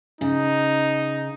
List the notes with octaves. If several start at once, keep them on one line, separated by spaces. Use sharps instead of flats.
C#3 D#4